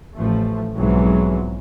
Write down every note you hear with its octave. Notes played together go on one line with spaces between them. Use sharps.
A1 F3 A3
B1 F2 G#2 E3 F#3 G#3